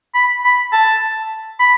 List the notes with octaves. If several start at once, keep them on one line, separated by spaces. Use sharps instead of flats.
B5
B5
A5
B5